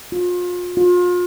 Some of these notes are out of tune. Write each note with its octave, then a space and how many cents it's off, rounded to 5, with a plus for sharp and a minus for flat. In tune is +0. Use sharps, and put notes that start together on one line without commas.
F4 +35
F4 +35